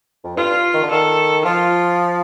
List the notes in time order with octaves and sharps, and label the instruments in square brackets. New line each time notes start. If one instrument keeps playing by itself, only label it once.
[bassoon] F2
[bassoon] G2 [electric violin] F4
[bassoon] D#3
D3
[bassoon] D#3 [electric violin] A4
[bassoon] F3 [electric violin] F4